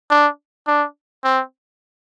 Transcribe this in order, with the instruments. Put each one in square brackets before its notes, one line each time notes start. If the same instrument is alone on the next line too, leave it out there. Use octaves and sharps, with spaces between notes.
[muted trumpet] D4
D4
C4